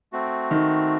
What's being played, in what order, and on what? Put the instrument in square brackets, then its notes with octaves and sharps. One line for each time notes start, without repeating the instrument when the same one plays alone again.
[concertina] A3 C4 F#4
[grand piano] D#3